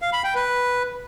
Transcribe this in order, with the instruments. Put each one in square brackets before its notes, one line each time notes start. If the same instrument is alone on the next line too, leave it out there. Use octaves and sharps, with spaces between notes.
[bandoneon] F5
B5
G5
B4